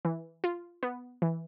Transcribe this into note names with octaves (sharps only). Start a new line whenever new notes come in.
E3
F4
B3
E3